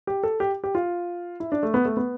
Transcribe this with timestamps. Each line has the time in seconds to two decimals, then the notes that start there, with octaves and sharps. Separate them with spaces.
0.07 G4
0.23 A4
0.40 G4
0.64 G4
0.75 F4
1.40 E4
1.52 D4
1.63 A3
1.74 B3
1.85 A3
1.97 B3